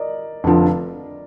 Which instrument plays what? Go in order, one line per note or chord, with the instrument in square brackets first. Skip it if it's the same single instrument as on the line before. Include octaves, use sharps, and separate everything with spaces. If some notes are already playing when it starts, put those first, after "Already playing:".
Already playing: [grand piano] A#4 D5 D#5
[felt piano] F1 D3 F3